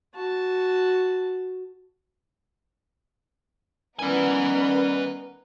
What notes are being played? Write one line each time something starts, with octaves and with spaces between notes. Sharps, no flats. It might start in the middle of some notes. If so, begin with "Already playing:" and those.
F#4 A5
D#3 G3 B3 C#4 A#4 B4 G#5